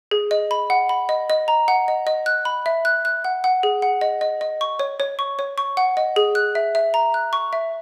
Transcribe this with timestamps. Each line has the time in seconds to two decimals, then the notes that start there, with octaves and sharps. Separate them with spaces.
0.11 G#4
0.31 D#5
0.51 B5
0.70 F#5
0.89 B5
1.09 D#5
1.30 D#5
1.48 A#5
1.68 F#5
1.88 D#5
2.07 D#5
2.26 F#6
2.45 B5
2.66 E5
2.85 F#6
3.05 F#6
3.25 F#5
3.44 F#5
3.63 G#4
3.82 F#5
4.01 D#5
4.21 D#5
4.41 D#5
4.61 C#6
4.79 C#5
5.00 C#5
5.19 C#6
5.39 C#5
5.58 C#6
5.77 F#5
5.97 D#5
6.16 G#4
6.35 F#6
6.55 E5
6.75 E5
6.94 A#5
7.14 F#6
7.33 C#6
7.53 E5